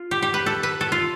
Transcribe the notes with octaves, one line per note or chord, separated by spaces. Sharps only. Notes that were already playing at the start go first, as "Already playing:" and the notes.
Already playing: F4
G4
G4
B4
A4
B4
A4
F4